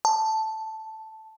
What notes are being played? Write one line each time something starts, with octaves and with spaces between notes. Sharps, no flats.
A5